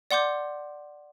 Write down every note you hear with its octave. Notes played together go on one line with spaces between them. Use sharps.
D5 F#5 C6 D6 G6